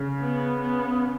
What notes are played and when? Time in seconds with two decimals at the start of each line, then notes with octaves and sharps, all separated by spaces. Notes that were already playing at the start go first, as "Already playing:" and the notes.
Already playing: C#3
0.21 B3
0.62 B3